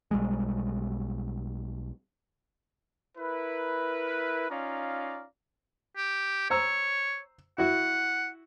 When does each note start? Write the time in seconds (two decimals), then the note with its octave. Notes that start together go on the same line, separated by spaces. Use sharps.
0.11 B1 G3 G#3
3.17 E4 A#4 B4
4.49 C#4 D#4 F4 D5 F5 A#5
5.97 G4
6.50 C5 C#5 A#5 E6
7.58 E4 F#4 F#5